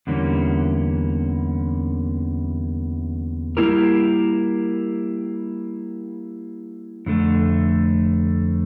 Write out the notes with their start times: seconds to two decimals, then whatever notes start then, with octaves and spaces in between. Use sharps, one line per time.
0.07 E2 D3 G3 A#3 C#4
3.57 G3 A#3 E4 G4 A#4
7.06 F2 D3 A3